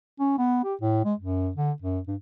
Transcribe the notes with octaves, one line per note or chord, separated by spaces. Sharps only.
C#4
B3
G4
A2
G#3
F#2
D3
F#2
G2